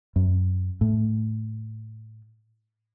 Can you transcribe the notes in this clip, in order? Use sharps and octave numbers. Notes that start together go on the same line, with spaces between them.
F#2
A2